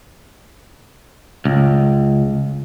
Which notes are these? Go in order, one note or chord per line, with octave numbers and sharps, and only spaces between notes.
C#2